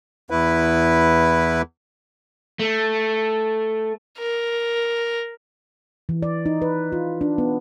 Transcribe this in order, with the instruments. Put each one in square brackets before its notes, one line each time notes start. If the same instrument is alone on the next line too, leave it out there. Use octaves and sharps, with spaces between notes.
[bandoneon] E2 E4 B4
[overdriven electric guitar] A3
[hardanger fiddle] A#4
[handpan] E3
D5
D#4
B4
F4
D4
B3